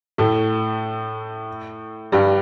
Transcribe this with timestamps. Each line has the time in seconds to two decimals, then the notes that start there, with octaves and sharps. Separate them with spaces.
0.18 A2 A3
2.12 G2 G3